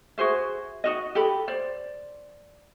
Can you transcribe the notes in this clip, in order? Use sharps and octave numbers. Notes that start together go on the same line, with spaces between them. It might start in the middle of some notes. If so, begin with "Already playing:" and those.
F#4 G#4 C5 E5
D#4 F#4 D#5
G4 A4 B5
C5 D5